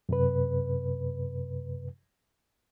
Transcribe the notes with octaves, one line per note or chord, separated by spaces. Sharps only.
F#2 C3 B4